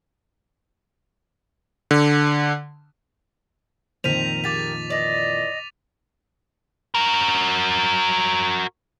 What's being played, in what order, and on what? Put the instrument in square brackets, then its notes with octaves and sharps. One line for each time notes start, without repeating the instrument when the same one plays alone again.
[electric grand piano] D3
[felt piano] F2 A#2 D#3 [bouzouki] C4 A#4 [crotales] B6 D#7 F7
[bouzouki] A#3 G4 G#4 [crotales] D6 A6 B6
[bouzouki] E3 D5 [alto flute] D#5
[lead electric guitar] F#4 A#4